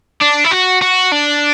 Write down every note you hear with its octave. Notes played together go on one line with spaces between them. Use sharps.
D4
E4
F#4
F#4
D4